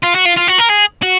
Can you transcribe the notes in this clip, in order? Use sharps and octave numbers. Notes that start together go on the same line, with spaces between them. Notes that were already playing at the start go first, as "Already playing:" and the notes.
F4
F#4
F4
F4
F#4
A#4
G#4
F#4